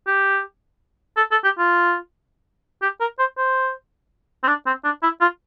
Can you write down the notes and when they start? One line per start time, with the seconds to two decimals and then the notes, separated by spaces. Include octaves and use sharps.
0.07 G4
1.17 A4
1.31 A4
1.44 G4
1.59 F4
2.82 G4
3.00 A#4
3.19 C5
3.38 C5
4.44 C4
4.47 D4
4.66 C4
4.84 D4
5.03 E4
5.21 F4